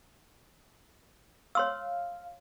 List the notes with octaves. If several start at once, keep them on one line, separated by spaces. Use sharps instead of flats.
C#5 F5 C6 E6